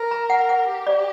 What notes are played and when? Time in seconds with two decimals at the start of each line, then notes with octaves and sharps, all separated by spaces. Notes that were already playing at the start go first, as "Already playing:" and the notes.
Already playing: A#4
0.11 A#5
0.30 F#5
0.49 F#5
0.68 G4
0.87 D5